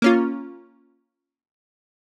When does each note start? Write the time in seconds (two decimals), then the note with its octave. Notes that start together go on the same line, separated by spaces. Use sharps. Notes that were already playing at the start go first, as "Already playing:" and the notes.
0.02 A#3 C#4 F4